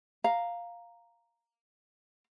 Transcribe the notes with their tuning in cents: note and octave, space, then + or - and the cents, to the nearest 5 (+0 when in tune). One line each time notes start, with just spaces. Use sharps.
F5 +0 A#5 +0